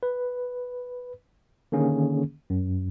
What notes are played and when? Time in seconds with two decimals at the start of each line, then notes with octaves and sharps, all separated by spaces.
0.03 B4
1.72 D3 D#3 A#3 C#4 G#4
2.50 F#2